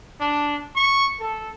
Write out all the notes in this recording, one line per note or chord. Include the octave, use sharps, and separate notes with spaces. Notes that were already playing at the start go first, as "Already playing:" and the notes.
D4
C#6
A4